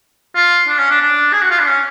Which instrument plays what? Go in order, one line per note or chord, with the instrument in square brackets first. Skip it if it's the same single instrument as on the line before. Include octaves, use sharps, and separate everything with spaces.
[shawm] F4
D4
C#4
D4
D4
G#4
F#4
F4
D4
C#4